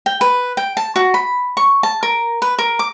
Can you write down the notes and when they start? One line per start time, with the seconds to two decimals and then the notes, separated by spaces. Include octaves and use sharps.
0.06 G5
0.21 B4
0.57 G5
0.77 A5
0.96 F#4
1.14 B5
1.57 C#6
1.83 A5
2.03 A#4
2.42 B4
2.59 A#4
2.79 D6